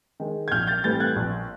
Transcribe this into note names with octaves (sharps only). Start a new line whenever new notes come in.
D#3 G#3
G#6
A#1 F6 G6
G6 A6
A2 E3 G3 C4 G6 A6
F#6 G#6
A#1